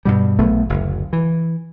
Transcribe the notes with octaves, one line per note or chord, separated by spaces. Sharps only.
G2 B2 G3
A#1 F#3 A3 B3
F#1 D2
E3